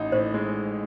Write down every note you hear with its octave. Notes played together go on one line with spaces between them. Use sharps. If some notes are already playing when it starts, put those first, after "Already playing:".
Already playing: A1 D#4
A2 C5
G#3